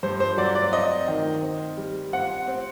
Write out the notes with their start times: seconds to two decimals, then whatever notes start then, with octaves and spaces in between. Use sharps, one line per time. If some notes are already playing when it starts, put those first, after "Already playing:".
0.03 G2 C5
0.20 C5
0.37 F#3 D5
0.55 D5
0.73 C4 D#5
1.08 D#3
1.42 C4
1.77 G3
2.13 C4 F#5
2.48 C4